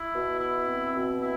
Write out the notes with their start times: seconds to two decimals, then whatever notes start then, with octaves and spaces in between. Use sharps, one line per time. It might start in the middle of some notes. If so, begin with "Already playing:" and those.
Already playing: E4
0.12 B2
0.39 E4
0.66 C4
0.93 B2
1.21 E4